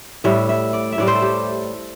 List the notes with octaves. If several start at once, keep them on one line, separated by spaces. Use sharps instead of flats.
A2 G3 E5
E5
D5
E5
A2 G3 D5
C5
A4
G4